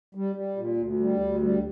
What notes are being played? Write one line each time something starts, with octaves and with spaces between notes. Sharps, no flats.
G3
G3
A#2
D2
G3
D2
G3